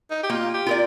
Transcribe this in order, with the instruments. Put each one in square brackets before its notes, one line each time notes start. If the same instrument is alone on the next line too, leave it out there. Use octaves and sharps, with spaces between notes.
[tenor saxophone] D#4
G4
[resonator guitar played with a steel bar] A#3 [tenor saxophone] F4
[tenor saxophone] G4
[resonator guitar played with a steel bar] F4 A#4 D5